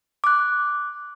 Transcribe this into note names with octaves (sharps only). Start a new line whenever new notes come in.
D6 F#6